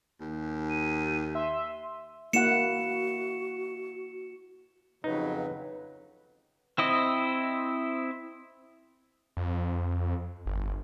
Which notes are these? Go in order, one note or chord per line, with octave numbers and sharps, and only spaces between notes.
D#2
D#7
E5 C6
A#3 E4 F#4 F#5 C#7 E7
F2 C#3 F#3 D#4 B4
C4 E4 D#5
F2
G1